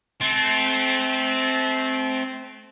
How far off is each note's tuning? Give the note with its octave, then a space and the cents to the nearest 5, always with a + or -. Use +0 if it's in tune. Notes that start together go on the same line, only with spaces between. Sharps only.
A3 -35 C4 +0